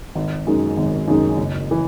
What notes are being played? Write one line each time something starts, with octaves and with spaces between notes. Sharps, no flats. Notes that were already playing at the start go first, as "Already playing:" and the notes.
G#1
F#2 D#3 G#3 D#4
G#1
F#2 D#3 G#3 D#4
F#1
E3